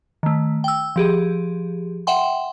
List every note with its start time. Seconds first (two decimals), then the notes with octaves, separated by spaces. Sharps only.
0.23 D#3 A3
0.64 G5 E6
0.96 F3 G4 G#4
2.07 E5 F#5 G5 C6